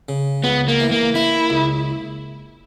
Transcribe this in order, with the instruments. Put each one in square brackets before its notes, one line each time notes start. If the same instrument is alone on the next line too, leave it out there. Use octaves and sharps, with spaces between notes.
[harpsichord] C#3
[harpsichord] C#2 [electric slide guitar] B3
[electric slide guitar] A#3
[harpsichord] E3
[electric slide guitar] A#3
[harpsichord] A#3 [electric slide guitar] E4
[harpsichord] C#2